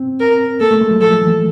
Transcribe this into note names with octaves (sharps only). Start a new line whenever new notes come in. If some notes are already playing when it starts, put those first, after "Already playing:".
Already playing: C4
A#4
A#3 A4
A3
G#3
F#3
F3 A4
E3